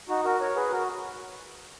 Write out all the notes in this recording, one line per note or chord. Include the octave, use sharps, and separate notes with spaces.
D#4 F#4
F#4 A#4
A#4 C#5
G#4 B4
F#4 A#4